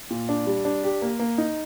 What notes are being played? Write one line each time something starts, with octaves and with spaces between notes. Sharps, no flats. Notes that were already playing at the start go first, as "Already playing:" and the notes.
A#2
D4
G3
D4
G4
A#3
A#3
D#4